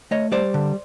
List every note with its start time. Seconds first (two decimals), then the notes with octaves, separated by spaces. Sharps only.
0.11 A3 C#5 D#5
0.32 G3 C5 D5
0.54 D3